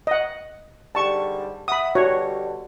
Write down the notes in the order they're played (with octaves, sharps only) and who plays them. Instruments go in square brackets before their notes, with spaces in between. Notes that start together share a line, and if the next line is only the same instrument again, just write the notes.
[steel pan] D#5 F#5
[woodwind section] G#2 D3 G3 [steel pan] A5 C#6
[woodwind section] E5 F#5 [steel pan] B5 D#6
[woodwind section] B2 D3 G3 [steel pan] F#4 C#5